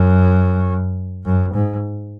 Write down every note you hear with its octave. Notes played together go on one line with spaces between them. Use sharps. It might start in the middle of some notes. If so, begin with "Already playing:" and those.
Already playing: F#2
F#2
G#2